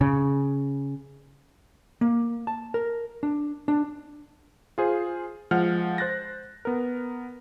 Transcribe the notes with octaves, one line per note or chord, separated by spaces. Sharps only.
C#3
A#3
A5
A#4
D4
D4
F4 G#4 C5
F3 G#3 F#5 F6
C5 F#6 A6 A#6
B3 A#4